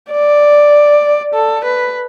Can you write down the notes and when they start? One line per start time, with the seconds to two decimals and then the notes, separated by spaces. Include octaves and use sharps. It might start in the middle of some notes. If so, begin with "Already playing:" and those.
0.12 D5
1.34 A4
1.65 B4